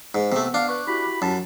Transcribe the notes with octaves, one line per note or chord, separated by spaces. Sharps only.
G#2
C3 A3 B3
D4 F5
B4 C#6 D6 F#6
E4 F#4 G4 B5
F#2 A5